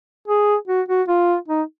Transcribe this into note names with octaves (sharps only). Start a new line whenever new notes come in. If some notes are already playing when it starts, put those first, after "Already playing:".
G#4
F#4
F#4
F4
D#4